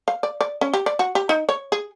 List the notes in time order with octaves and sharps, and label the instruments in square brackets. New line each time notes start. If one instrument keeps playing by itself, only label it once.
[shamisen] F5
D5
D5
C#4
G4
D5
F#4
G4
D#4
C#5
G#4